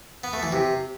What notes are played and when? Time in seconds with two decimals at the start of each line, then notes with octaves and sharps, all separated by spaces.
0.24 B3
0.33 A3
0.43 E3
0.52 C3